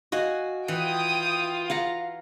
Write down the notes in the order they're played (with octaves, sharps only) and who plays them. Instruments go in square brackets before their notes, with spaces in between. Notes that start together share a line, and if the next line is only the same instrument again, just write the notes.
[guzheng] F#4 [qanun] D#5 F5 G#5
[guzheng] E3 [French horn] F4 [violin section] G5 D#6
[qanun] F5 F#5 A#5